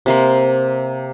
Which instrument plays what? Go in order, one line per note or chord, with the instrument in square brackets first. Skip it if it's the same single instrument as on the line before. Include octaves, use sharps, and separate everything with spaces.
[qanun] C3 A#3 C6